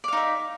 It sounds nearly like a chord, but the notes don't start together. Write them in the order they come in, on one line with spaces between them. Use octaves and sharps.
D5 F5 D#4 E5